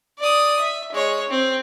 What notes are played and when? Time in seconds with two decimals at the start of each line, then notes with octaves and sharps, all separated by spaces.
0.19 D5 D#6
0.61 E5
0.92 G#3 C#5
1.30 C4